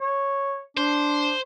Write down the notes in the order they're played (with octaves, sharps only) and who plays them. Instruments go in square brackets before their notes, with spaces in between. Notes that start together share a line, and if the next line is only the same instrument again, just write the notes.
[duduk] C#5
[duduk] D4 [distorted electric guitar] C5